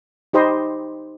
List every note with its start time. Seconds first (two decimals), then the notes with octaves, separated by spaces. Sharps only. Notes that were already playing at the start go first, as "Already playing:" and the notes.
0.33 D#4 G4 C5 D#5 B5 C6